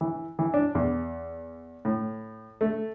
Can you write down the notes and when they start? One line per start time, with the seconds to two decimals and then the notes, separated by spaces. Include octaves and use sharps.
0.01 E3
0.39 E3
0.54 D4
0.75 E2
1.85 A2
2.61 A3